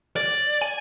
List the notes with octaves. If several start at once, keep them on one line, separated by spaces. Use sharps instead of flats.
D5
G#5